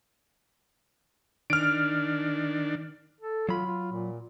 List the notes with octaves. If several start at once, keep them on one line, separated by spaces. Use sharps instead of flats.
D#3 D4 F6 D7
A4
F#3 F4 B5
F4
A#2